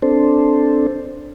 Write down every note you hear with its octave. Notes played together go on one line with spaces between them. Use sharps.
C4 D4 A4 C5